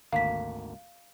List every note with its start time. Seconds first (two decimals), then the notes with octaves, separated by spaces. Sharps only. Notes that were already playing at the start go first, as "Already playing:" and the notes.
0.13 G#1 D2 A#3 F5 B6